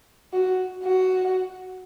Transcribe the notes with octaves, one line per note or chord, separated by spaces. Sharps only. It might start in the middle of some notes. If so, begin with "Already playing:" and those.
F#4
F#4